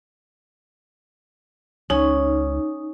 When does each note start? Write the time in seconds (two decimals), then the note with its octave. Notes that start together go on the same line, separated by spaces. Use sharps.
1.90 C#2 C#4 D#4